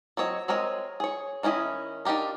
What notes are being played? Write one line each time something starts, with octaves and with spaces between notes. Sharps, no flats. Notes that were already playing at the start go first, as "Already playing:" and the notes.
F#3 C4 C#5 D#5
G#3 C4 A#4 C#5 D#5
G#4 C#5
D#3 C#4 E4 F#4 D#5
D4 D#4 F4 G4 A#4